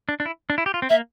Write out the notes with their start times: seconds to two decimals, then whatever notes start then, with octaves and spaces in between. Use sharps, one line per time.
0.09 D4
0.20 D4
0.26 E4
0.50 D4
0.58 E4
0.66 G4
0.74 F4
0.82 C4
0.90 A#3 E5